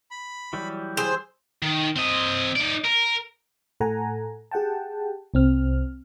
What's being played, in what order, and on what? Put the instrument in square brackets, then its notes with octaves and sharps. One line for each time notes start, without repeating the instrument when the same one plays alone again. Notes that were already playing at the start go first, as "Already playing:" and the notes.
[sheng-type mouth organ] B5
[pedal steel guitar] E3 F#3 G3
[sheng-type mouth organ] G#4 E6 [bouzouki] C5
[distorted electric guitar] D#3
C4 D#5
D#4 D5
A#4
[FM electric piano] A2 A4 F#5 G#5 A#5
G4 G#4 F#5 G5 A5
C2 C4 F6